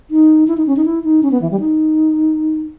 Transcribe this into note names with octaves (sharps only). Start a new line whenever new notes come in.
D#4
E4
D#4
C#4
D#4
E4
D#4
C#4
B3
E3
G3
D#4